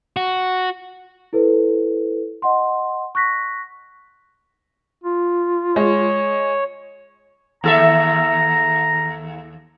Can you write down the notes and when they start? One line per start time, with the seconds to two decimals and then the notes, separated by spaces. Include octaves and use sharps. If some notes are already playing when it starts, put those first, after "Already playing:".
0.17 F#4
1.33 E4 A4 B4 C5
2.42 D#5 F#5 C6
3.15 C#6 F#6 A#6 B6
5.04 F4
5.76 G#3 C#5
7.64 D#2 A4 E5 A#5